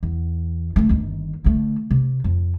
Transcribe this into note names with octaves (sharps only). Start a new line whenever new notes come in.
E2
E3 A3
G1 D#2
D3 A3
C3
F2